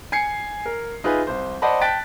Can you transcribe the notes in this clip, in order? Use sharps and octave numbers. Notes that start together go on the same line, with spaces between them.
G#5 G#6 C7 C#7
A#4
D#4 F4 G#4 B4 E5
C2 C5
C5 D5 D#5 F#5 A5 B5
G5 A5 F#6 A6 B6 D7